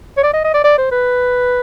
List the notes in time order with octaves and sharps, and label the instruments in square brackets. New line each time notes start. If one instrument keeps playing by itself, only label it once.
[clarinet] C#5
D5
D#5
D#5
D5
D5
C5
B4